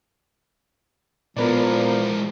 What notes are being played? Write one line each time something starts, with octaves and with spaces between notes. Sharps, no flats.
A#2 E3 F3 G#3 B3 A#4 B4 D5